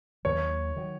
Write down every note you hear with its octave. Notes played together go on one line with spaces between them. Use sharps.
D#2 D#3 F#3 C#5
D#3 F#3